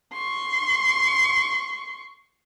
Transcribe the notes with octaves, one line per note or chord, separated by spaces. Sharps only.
C6 C#6